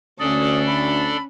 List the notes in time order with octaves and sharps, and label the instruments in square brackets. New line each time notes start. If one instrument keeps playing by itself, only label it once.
[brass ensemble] D2 [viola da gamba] C#4 [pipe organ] D4 A4 D5 [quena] D#6
[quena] B5